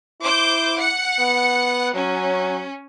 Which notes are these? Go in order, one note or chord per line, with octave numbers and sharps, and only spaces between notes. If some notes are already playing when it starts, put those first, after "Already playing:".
E4 C5 D6 G6
F#5 C#7
B3
F#3 C#4